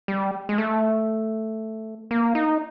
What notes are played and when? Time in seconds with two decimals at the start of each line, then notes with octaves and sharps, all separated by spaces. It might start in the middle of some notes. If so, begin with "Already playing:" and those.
0.08 G3
0.49 G#3
0.58 A3
2.11 A#3
2.35 D#4